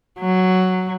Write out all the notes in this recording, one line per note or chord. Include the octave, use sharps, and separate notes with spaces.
F#3